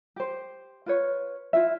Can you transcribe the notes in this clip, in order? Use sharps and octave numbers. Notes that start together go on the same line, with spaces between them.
G4 C5
F4 B4 C#5
E4 F4 E5